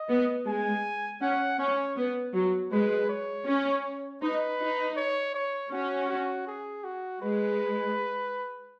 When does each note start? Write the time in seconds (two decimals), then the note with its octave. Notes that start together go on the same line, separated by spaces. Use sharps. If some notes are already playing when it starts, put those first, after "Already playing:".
Already playing: D#5
0.09 B3
0.47 G#3 G#5
1.21 C#4 F#5
1.59 C#4 C#5
1.97 B3
2.34 F#3
2.72 G#3 B4
3.09 C#5
3.47 C#4
4.22 D#4 B4
4.59 D#4
4.96 C#5
5.34 C#5
5.71 C#4 F#4
6.09 F#4
6.47 G#4
6.84 F#4
7.21 G#3 B4